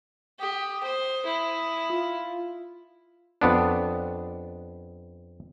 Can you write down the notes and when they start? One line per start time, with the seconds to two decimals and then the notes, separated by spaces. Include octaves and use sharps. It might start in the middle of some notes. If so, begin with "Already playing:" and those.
0.40 G4 D#6
0.83 C5
1.25 E4
1.90 F4
3.42 F2 B3 D4